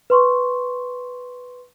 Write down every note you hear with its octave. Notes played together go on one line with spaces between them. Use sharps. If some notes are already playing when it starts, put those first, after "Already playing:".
B4 C6 C#6